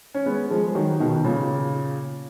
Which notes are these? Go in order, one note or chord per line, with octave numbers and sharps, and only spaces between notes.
C#4
G#3 B3
F3 G#3
G#3
D#3 F#3
B2 D#3
B2
A#2 C#3